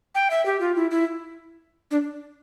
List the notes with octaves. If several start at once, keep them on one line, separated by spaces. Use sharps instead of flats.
G5
E5
G4
F4
E4
E4
D4